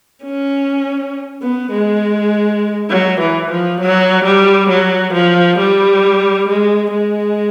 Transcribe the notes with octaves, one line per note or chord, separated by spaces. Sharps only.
C#4
B3
G#3
F#3
E3
F3
F#3
G3
F#3
F3
G3
G#3
G#3